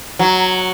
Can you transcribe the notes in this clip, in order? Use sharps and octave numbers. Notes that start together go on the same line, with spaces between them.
F#3